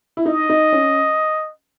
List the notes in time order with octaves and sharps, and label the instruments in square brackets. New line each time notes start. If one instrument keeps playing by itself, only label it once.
[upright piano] E4
[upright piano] D#4 [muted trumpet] D#5
[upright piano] D#4
C#4